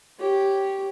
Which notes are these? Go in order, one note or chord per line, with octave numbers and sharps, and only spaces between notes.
G4 C#5